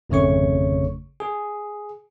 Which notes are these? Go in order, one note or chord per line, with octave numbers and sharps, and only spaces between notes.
G#1 F2 C#3 A3 C#5 C#6
G#4